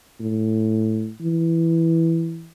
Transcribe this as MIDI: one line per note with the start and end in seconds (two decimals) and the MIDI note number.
0.20 1.10 45
1.21 2.51 52